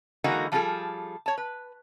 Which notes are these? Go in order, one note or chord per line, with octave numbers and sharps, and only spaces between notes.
D3 E3 G#3 A#3 D#4 F#4
F3 G3 D4 F4 G#4 A4
C#5 A5
B4